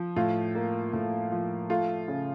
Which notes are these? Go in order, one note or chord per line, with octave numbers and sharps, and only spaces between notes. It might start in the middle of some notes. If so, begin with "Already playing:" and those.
Already playing: F3
A2 F4
A#3
A2
F3
A3 F4
C#3